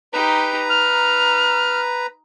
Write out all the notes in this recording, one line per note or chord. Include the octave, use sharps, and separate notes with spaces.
D#4 G4 B4 A#5
D#4 F6